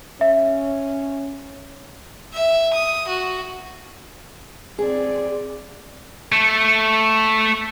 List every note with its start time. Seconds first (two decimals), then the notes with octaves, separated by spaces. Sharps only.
0.21 C#4 E5
2.34 E5
2.74 D#6
3.08 F#4
4.79 C4 G#4 D5
6.32 A3